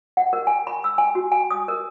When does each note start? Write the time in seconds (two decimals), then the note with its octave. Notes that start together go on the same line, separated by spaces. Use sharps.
0.17 F#5
0.33 A#4
0.47 G#5
0.67 B5
0.84 E6
0.98 G#5
1.15 F#4
1.32 G#5
1.51 D#6
1.68 A#4